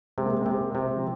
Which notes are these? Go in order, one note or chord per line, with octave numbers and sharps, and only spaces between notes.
C3 G#3
A#3
G#3
A#3
C3 G#3
C3
F3